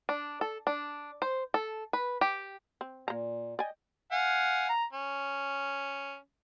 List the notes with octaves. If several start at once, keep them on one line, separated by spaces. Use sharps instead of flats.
D4
A4
D4
C5
A4
B4
G4
C4
A#2 A#3 A#5
D5 D#5 G5 G#5
F5 F#5 G#5
A#5
C#4